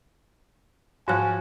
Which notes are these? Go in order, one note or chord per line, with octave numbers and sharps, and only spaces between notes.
G#2 F3 F#4 C#5 G#5 F#6